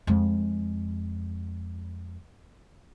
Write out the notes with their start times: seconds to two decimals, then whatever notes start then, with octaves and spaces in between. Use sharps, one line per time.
0.07 F2 G#3